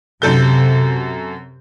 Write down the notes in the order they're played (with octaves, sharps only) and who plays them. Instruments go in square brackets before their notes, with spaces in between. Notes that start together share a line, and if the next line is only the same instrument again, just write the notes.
[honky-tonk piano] F#2 A4 G6 [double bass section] C3